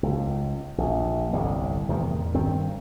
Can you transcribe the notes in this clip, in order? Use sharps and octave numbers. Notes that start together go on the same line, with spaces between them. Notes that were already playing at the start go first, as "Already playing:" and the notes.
C#2
A#1
G1 C2 A2
E2 A2 C3 D#3
G2 D#3 C4